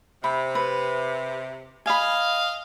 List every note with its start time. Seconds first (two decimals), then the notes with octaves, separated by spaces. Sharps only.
0.24 C3 B5
0.55 B4
1.86 D#5 F5 G#5 B5